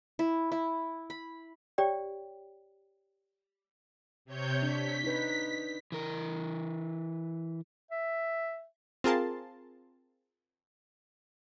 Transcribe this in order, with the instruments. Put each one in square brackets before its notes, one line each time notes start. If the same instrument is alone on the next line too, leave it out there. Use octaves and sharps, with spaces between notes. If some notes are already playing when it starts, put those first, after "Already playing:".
[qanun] E4
E4
B5
[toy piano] G4 C#5 D5 G5
[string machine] C3 C#5 G6
[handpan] D4 [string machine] B6
[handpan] D#4 B4
[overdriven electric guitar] E3 A#4
[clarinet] E5
[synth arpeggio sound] C4 F4 G#4 A#4 A5 C6